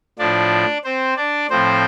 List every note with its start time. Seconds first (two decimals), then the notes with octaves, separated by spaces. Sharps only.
0.19 A2 F3 D4 D5
0.84 C4 C5
1.17 D4 D5
1.50 A2 F3 C4 C5